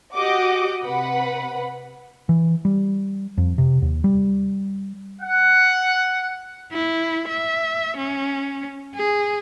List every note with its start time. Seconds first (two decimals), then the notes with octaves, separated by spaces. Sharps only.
0.14 F#4 G4 D#5 F#5 D6
0.84 C3 B4 F#5 B5
2.29 E3
2.65 G3
3.38 F2
3.58 C3
3.82 D#2
4.04 G3
5.21 F#5
6.73 E4
7.28 E5
7.97 C#4
8.95 G#4